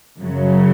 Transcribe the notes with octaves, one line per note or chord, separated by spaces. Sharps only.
F#2 C#3 F#3